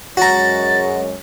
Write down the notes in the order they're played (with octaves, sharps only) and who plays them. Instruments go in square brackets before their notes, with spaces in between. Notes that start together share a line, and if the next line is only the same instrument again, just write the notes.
[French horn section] F#2 G#3 C#5 [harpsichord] F#4 A#5 [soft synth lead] A6